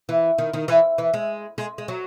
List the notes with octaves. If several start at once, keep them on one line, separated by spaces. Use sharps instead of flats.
E3
D#3
D#3
E3
E3
G#3
G#3
G#3
F#3